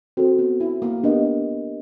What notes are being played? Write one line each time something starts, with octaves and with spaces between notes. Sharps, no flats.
C4 F#4 A4 C5
B3
E4
A#3
B3 D4 G4 A#4 D#5